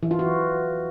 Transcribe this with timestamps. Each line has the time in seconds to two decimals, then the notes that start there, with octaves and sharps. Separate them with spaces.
0.03 E3
0.11 F4
0.19 F#4